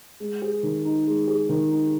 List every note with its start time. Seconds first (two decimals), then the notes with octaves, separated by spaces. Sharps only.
0.20 G#3
0.42 G#4
0.63 D#3
0.85 D#4
1.07 G#3
1.27 G#4
1.49 D#3
1.71 D#4